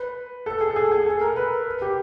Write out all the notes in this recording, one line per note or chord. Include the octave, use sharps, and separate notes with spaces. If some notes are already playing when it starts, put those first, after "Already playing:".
Already playing: B4
A4
G#4
A4
G#4
G#4
A4
A#4
B4
G4